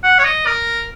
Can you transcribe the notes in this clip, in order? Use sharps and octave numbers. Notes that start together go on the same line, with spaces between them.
F#5
C#5
D#5
A#4